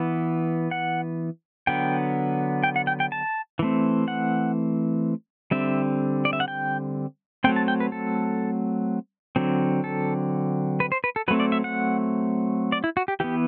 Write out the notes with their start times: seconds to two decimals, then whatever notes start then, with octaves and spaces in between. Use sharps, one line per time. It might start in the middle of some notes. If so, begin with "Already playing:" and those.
Already playing: E3 B3
0.71 F#5
1.67 D3 F#3 B3 G5
2.64 G5
2.76 F#5
2.87 G5
3.00 G5
3.12 A5
3.59 E3 A3 C4
4.08 F#5
5.51 D3 G3 C4 E5
6.25 D5
6.33 E5
6.40 F#5
6.48 G5
7.44 F#3 A3 C4 G5
7.56 A5
7.68 G5
7.80 B4
7.92 A4
9.36 D3 F#3 C4
9.84 A4
10.80 B4
10.92 C5
11.04 B4
11.16 A4
11.28 F#3 A3 C4 B4
11.40 D5
11.52 E5
11.64 F#5
12.72 D5
12.84 E4
12.97 F#4
13.08 G4
13.20 E3 B3 G4